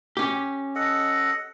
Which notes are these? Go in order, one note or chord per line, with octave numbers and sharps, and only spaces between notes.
C#4 G4
A4 D#5 F#5